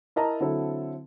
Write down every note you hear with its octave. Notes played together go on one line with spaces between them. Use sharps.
E4 A#4 D#5 E5 A5 A#5
D3 F#3 C4 E4 A4